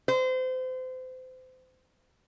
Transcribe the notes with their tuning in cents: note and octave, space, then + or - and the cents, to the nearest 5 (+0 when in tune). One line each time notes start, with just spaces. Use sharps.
C5 -30